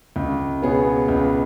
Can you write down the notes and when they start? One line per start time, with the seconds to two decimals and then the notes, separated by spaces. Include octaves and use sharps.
0.16 C#2
0.62 B2 B3 G#4 C#5
1.08 C#2